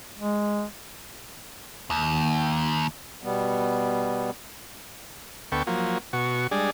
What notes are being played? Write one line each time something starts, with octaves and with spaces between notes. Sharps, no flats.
G#3
D#2
B2 G3 B3
D2 B3 A4 G5 C#6
F3 F#3 A#3
B2 F#4 C#6
G3 G#3 D4 G#4 D5